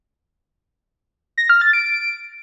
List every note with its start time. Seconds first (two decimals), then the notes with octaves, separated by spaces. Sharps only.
1.38 A#6
1.49 F6
1.61 A6
1.73 D7